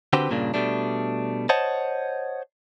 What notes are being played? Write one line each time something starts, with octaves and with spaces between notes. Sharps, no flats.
D3 C4 F#4 G4 B4 C5
G2 A#2 C#3 A#3 D4
B2 G3 A3 D4
C5 C#5 D#5 F#5 A5